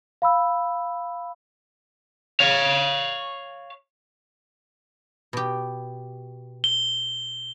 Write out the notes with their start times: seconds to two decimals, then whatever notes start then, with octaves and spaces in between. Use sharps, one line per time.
0.22 F5 B5 E6
2.40 C#5 F5
5.33 B2 G4
6.64 G7